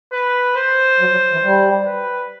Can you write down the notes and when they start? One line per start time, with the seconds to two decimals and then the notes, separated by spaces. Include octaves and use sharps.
0.12 B4
0.56 C5
1.00 F#3
1.11 F#3
1.32 E3
1.43 G3
1.86 B4